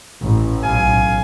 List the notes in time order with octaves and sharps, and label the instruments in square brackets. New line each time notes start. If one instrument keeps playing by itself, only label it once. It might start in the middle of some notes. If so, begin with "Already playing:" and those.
[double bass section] A1
[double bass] B1 [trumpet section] F5 G#5